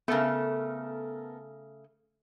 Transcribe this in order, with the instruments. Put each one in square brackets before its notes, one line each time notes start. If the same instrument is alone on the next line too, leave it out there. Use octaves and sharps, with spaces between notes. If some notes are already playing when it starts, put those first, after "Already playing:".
[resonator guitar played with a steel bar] C#3 A3 [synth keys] B3 A4 A#4